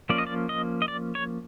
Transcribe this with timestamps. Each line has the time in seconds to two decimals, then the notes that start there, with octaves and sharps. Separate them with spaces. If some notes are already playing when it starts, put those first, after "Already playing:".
0.09 F3 A#3 C#4 D5
0.18 D#5
0.27 D5
0.49 D#5
0.82 D#5
0.88 D5
1.15 C#5